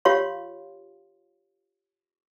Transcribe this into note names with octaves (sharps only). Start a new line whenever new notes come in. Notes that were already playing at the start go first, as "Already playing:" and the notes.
F4 G4 C#5 F5 C6